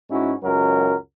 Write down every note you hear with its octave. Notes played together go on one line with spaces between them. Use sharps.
G#2 C#4 E4 F#4
C#2 F#2 F#3 A#4